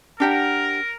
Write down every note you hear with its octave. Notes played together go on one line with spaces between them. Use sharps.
D4 G4 A#4 F#5